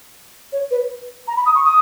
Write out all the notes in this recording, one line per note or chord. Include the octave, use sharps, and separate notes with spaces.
C#5
B4
A#5
B5
D#6
C#6
D#6